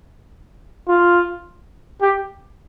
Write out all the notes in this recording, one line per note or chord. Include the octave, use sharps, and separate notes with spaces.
F4
G4